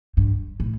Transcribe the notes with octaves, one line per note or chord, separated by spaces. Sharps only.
G2
A2